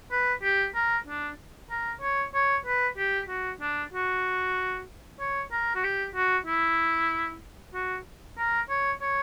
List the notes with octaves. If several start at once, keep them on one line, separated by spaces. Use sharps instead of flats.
B4
G4
A#4
D4
A#4
C#5
C#5
B4
G4
F#4
D4
F#4
C#5
A#4
F#4
G4
F#4
E4
F#4
A#4
C#5
C#5